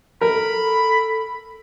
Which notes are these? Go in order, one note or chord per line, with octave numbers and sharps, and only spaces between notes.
A4 A#4 B5